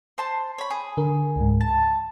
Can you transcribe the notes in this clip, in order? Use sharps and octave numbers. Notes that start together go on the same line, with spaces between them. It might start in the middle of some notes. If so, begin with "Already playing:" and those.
C5 A5 C6
C#5 B5
G#4
D3 A#4
C#2 G#2
A5 A6